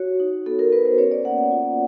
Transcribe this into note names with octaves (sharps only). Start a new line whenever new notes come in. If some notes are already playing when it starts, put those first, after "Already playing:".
Already playing: F#4 C#5
D#4
B3 A4
A#4
B3 B4
C5
C#4 C#5
D5
A#3 F#5
F#5
F4